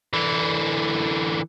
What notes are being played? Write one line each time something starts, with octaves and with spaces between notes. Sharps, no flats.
D3 E3